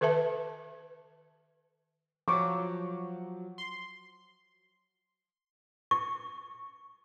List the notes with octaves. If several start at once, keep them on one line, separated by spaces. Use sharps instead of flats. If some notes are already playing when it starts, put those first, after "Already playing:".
D#3 A4 B4 E5 A5
F3 F#3 C#6 D6
C6
C#6